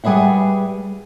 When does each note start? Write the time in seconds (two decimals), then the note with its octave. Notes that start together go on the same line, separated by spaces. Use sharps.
0.04 G3 G#4 B4 E5 F#5